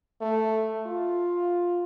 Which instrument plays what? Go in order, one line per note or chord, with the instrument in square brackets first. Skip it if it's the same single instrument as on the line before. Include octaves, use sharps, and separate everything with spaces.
[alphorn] A3
F4